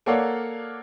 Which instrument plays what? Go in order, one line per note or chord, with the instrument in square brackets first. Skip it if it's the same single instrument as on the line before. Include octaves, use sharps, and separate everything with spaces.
[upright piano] A#3 A4 C#5 D5 F5 F#5